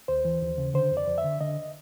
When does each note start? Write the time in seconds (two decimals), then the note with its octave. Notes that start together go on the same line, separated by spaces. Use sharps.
0.08 D#2 C5
0.25 E3
0.42 D#2
0.58 C#3
0.74 D3 C5
0.91 F2
0.97 D5
1.08 F2
1.18 E5
1.24 D3
1.40 D3 D#5